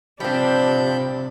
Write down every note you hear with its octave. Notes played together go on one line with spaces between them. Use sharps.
C3 F3 G3 C4 D4 B5 G6